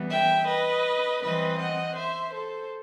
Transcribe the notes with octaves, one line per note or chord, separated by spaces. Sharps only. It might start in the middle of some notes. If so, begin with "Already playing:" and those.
Already playing: E3 G3 B3
E5 G5
B4 D#5
E3 G3 C4 B4 D#5
D#5 F#5
C5 E5
A4 C5